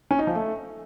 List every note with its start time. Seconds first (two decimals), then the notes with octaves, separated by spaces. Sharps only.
0.11 C#4
0.19 D#4
0.27 F3
0.35 A3